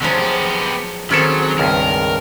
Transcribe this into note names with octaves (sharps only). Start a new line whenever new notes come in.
D3 F3 F#3 G#3 C#4
B3 G4
D#3 F#3 C4 C#4 G#4 A4
C#2 G2 A#4